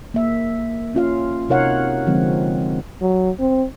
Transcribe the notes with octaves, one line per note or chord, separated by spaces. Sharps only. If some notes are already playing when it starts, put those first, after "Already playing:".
A#3 E5
C#4 F4 F5
C3 D#4 A#4 C#5 F5 F#5
D3 F3 G#3 C4
F#3
C4